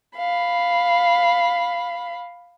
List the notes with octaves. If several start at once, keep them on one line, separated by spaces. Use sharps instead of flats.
F5 B5